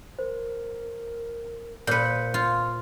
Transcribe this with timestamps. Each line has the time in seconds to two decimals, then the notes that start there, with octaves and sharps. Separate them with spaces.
0.19 A#4 C5
1.87 A#2 B4 C5 G6 C#7
2.34 F4